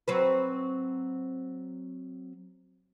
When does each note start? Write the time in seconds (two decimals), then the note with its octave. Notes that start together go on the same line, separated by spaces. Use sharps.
0.08 F#3 C4 B4